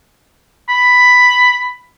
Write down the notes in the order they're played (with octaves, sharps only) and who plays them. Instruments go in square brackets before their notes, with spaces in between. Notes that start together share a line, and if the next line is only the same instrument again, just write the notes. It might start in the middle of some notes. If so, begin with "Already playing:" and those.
[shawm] B5